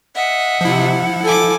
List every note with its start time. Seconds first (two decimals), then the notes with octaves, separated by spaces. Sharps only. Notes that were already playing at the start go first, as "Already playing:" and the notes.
0.15 D#5 E5 F#5
0.61 C3 F3 E4
1.24 A4 G#5 D6